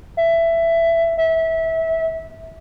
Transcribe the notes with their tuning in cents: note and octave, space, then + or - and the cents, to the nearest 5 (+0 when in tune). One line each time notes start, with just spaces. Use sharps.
E5 +15
E5 -20